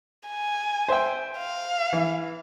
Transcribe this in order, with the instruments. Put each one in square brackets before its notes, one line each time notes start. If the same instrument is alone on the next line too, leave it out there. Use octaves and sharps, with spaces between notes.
[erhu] G#5
[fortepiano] C5 E5 G5
[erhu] F5
[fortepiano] E3